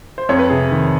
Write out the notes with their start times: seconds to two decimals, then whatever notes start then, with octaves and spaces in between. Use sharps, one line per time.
0.18 C5
0.29 F2 C#5
0.39 B4
0.50 C3 G#4
0.71 D#3